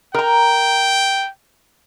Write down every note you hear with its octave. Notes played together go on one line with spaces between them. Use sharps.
A#4 G5 A#5